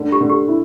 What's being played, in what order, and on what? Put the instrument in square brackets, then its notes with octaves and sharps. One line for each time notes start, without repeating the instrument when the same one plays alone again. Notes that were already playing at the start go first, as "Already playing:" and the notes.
Already playing: [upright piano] G2 D3
[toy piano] G4
[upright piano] D3
[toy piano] G4
[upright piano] E4